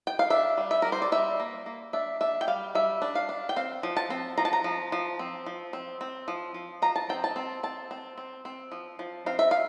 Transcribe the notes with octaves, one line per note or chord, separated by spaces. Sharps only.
G5
F5
D4 E5
G3
E5
G3 A#4
C5
D5
G3 E5
A#3
A#3
D4 E5
D4 E5
G5
G3 F5
G3 E5
D4
F5
D4
G5
C4 F5
F3
A5
C4
F3 A#5
A5
A#5
F3
F3
C4
F3
C4
C4
F3
F3
F3 A#5
A5
C4 G5
A5
C4
C4 A5
C4
C4
C4
F3
F3
C4 F5
E5
F5